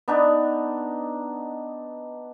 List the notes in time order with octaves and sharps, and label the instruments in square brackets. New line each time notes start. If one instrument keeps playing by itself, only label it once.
[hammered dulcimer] B3 D4 D#4